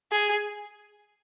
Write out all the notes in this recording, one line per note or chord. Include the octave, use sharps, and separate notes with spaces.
G#4